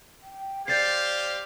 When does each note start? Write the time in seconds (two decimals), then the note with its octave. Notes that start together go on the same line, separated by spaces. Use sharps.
0.22 G5
0.68 G4 C5 D5 F5 G6 A6 C7